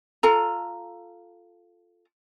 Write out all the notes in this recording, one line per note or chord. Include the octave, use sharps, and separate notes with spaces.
F4 A4 A#5